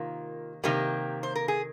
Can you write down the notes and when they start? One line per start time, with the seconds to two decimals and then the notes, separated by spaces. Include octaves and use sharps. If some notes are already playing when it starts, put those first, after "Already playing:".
Already playing: C3 D#3 A#3 F4
0.64 C3 D#3 G3 A#3 G4
1.23 C5
1.36 A#4
1.48 G#4